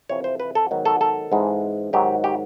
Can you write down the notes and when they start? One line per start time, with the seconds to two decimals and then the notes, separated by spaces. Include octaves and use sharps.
0.09 F2 C3 E3 C#5
0.24 C5
0.40 B4
0.55 A4
0.71 G#2 D#3 F#3 B3
0.85 A4
1.01 A4
1.32 G#2 E3 G#3 C4
1.93 G#2 D#3 F#3 G4
2.24 G4